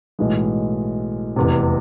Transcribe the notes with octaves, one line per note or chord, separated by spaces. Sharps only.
B1 A2 E3 G#3
F1 E2 C3